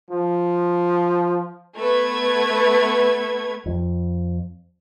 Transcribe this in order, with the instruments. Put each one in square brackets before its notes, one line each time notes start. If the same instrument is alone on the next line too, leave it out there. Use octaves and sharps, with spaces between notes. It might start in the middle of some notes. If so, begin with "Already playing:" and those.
[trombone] F3
[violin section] A3 B3 B4 G#6
[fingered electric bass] F2